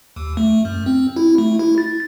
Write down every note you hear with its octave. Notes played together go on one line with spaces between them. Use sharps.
D#2
A3
F#2
C4
E4
A3
E4
A6